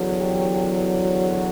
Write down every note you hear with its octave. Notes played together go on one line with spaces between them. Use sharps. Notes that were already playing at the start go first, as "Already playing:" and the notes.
Already playing: E2 D3 F#3
G4
F#4